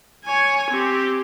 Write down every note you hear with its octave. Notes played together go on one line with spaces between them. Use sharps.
C#5 G#5
C4 G4